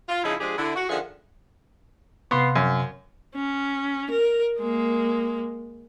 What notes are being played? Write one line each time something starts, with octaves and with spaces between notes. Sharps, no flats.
F4
C#3 F3 D#4 E4 G#4
F3 G#3 D4 G4 G#4
D3 E4
F#4
D3 D#3 F3 G#4 E5 F#5
C3 B3 F5 C6
F#2
C#4
A#4
G#3 A#3